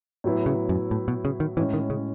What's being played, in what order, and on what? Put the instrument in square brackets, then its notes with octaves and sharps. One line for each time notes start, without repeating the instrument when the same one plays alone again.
[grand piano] A2 F#3 B3 E4
[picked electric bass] C#3
F#2
A2
B2
C#3
D#3
[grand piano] A2 G#3 C#4 [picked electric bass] E3
[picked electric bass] D#3
C#3